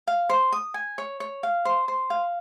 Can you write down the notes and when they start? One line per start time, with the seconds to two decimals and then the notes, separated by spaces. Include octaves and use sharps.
0.07 F5
0.29 C5
0.52 D#6
0.74 G#5
0.98 C#5
1.20 C#5
1.43 F5
1.65 C5
1.88 C5
2.10 F5